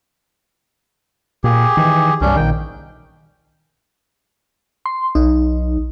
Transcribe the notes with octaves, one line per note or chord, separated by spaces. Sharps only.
A#2 G4 G#4
D#3 E3
C2 G2 C#4 D4
A#1 D#3 G5
C6
B1 D#4